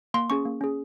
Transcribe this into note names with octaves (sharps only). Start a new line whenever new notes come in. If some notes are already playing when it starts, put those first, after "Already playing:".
A#3 C6
C#4 G#4 C#6
A#3
C#4 G#4